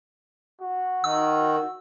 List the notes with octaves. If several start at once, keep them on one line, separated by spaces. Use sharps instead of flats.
F#4
D#3 E6